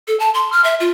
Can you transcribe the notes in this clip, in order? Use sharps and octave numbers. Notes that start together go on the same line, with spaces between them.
A4
A5
C6
F6
E5
F4